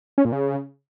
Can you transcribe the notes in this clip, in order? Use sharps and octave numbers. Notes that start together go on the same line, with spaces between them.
C#4
A#2
C#3